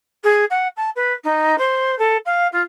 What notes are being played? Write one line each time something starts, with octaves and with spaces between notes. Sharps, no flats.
G#4
F#5
A5
B4
D#4
C5
A4
F5
F4